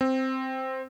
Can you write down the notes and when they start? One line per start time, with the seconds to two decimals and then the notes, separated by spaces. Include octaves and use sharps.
0.01 C4